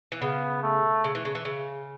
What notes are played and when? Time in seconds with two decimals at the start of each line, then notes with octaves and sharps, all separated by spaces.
0.12 E3
0.22 C#3 B3
0.63 A3
1.04 C#3
1.15 E3
1.25 C#3
1.35 E3
1.45 C#3